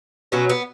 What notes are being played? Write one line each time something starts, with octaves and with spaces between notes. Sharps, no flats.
B2 F#3 C#4
B3